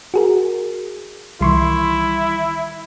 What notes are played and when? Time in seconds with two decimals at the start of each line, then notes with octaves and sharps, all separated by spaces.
0.14 F#4 G#4 A#4
1.41 C2 D#3 E3 G3 E4 C6 C#6